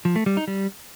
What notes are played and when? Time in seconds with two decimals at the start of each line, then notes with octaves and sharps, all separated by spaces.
0.05 F3
0.16 A3
0.26 G3
0.37 D#4
0.48 G3